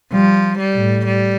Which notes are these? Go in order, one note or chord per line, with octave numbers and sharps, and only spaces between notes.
F3 G3
G3
A2
G3